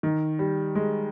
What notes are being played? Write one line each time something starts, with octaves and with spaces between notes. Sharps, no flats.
D#3
G3
G#3